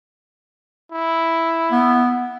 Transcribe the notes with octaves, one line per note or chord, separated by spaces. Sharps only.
E4
B3